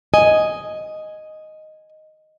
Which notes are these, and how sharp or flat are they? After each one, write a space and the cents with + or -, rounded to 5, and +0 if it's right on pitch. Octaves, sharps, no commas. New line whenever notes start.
D#5 +0 G#5 +0